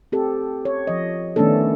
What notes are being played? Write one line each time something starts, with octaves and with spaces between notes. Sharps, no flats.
C4 G4 A4
C#5
F3 D#5
D#3 A3 B3 C#4 D4 A4